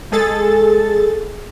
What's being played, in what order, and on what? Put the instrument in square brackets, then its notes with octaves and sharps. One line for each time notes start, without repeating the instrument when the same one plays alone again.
[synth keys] G#3 G#4 A4 A6